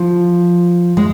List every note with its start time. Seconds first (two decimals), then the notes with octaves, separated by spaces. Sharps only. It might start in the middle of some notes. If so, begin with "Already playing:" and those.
Already playing: F3
0.97 G#3